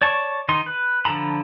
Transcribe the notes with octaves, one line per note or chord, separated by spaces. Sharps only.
C#5 D5 A5 C#6
D#3 D#4 C6
B4
D3 F3 A4 A#5 B5